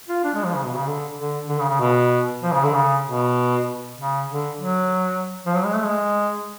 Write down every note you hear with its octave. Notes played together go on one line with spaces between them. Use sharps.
F4
D4
G#3
F3
C#3
B2
C#3
D3
D3
D3
C#3
C#3
B2
F3
C#3
D3
C#3
B2
C#3
D3
F#3
F3
F#3
G#3
A3
G#3